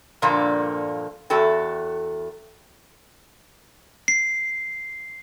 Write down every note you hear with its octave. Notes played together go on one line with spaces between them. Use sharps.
G2 A#2 D3 F3 A#3
E2 F#4 A4 G5
C7